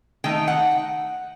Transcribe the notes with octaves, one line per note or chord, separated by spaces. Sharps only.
D#3 A3 D#4 G5
F#5